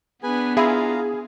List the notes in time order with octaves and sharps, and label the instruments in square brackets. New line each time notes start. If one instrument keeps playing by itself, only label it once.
[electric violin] B3 D4 [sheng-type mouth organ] G#4 B4 G#5
[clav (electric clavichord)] E4 [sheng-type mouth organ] F4 F5 A#5 [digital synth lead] G#4